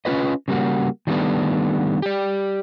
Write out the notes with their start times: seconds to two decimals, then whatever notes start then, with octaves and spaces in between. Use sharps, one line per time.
0.05 C#4 D#4 F4 B4 D#5
0.48 C#3 G3 A#3 F#4
1.07 D#3 F#3 G3 A3 B3 D4
2.02 G4 D5